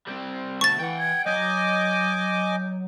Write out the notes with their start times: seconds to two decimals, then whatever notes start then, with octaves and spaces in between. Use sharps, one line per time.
0.07 G3 C4
0.61 D2 B2 A5 C#6 A6
0.80 E3 F#5 G5
0.99 G#6
1.26 F#3 D#5 G#5 D6 G6